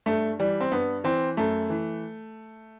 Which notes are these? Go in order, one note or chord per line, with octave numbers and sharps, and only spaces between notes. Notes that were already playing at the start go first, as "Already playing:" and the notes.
G2 A3
E3 G3
C4
G2 B3
E3 C4
F#2 A3
E3